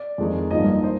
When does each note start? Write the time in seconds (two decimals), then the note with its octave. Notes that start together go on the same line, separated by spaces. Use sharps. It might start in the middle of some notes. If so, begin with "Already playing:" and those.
Already playing: D5
0.18 F2 D#3 G#3 D#4
0.51 G#1 G2 F3 A#3 D#4 D#5
0.68 D#5
0.84 C5